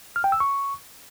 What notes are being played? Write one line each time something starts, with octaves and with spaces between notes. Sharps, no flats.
F6
G5
E6
C#6